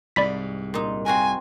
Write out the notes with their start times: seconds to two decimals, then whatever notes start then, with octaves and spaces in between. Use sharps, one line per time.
0.16 C2 G#2 D5 B5 B6
0.74 A#2 D#4
1.06 C4 F#4 A#4 G#5